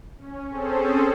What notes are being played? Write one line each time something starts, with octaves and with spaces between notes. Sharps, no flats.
C#4
C4 C#4 G#4 A4 C5